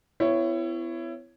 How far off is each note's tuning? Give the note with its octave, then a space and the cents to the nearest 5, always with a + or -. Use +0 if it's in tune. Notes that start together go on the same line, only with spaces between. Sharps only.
B3 +45 E4 +25 C#5 +0